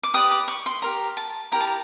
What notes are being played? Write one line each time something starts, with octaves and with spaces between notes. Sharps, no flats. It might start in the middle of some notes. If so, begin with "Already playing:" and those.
D6
G4 B4 D5 D#6
D6
C#6
C6
G4 A#4 C#5 A#5
A5
E4 G4 A#4 A#5
A5
A#5